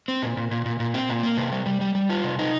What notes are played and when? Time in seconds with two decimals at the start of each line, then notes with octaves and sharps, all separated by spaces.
0.08 C4
0.22 A#2
0.37 A#2
0.51 A#2
0.66 A#2
0.80 A#2
0.94 C4
1.09 A#2
1.23 A#3
1.37 C3
1.52 G3
1.66 G3
1.81 G3
1.95 G3
2.10 F4
2.24 C3
2.39 D#4